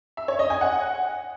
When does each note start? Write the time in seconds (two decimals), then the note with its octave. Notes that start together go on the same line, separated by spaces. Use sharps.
0.17 E5
0.28 C#5
0.39 D#5
0.50 G#5
0.61 F#5